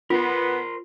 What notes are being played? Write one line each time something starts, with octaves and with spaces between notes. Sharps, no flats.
B3 F4 A#4 C5